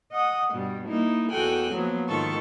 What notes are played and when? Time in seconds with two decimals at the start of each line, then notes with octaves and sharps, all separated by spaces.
0.11 D#5 F#5 D#6
0.54 G2 B2 G3
0.87 A#3 D#4 E4
1.30 E2 F#4 A4 G5 G#5 F#6
1.73 F3 F#3 A#3 B3
2.08 G#2 D#3 F4 A4 C#6